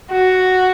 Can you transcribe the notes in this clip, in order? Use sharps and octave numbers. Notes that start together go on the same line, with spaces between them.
F#4